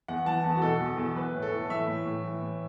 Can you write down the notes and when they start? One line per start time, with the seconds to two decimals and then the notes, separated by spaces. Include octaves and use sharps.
0.08 E2 F#5
0.26 E3 A5
0.44 E2
0.56 F#4
0.62 B2 A4
0.80 E2
0.98 E2
1.16 E3 B4
1.34 A2
1.42 A4
1.51 A2
1.69 E3 E5
1.87 A2
2.05 A2
2.23 E3
2.42 A2